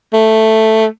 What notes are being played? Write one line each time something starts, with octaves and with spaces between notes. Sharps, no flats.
A3